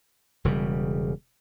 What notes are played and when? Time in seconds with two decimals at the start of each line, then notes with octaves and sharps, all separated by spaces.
0.45 E1 C#3 G3